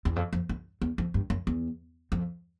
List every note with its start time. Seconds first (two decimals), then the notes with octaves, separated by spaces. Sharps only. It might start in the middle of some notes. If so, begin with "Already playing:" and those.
0.05 E2
0.16 F2
0.33 F2
0.49 F#2
0.81 E2
0.98 F2
1.14 G2
1.30 F#2
1.47 E2
2.12 F2